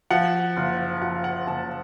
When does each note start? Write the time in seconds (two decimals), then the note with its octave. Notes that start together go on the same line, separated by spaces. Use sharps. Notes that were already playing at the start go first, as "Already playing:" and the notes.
0.11 F3 F#5
0.57 F#1
1.02 F3 F#5
1.24 F#5
1.47 F#1 A5